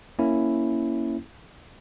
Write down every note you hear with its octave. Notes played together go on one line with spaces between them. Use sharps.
A#3 C#4 E4